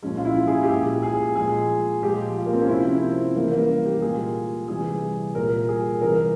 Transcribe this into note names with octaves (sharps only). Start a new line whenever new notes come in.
A#2 F3 G#3 C#4
F4
E4
G#4
G4
A#2 G#3 G#4
G#4
A#2 F3 G#3 G#4
A#2 F3 G#3 G4
F4
A#3
C4
C#4
C3 F3 G#3 E4
C4
C#3 E3 G3 A#3
A#3
G4
A#2 G#3 G#4
C3 E3 G3 G#4
A#2 G3 A#4
G#4
C3 E3 G3 A#4